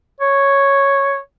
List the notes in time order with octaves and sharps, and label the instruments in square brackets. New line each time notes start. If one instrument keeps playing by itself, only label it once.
[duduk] C#5